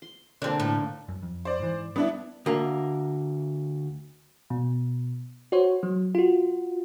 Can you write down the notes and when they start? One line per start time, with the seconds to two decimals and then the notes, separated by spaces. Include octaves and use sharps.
0.02 C6
0.42 D3 A#3 C4 D4
0.60 A2
1.09 F#2
1.22 F2
1.45 C5 D5
1.59 G#2 E3
1.96 G3 B3 D4 E4
2.46 D2 A#3
4.50 B2
5.52 F#4 C5 C#5
5.83 F#3
6.15 F4 F#4